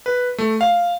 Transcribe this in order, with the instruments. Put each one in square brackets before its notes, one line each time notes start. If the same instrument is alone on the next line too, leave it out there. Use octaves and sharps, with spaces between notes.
[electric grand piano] B4
A3
F5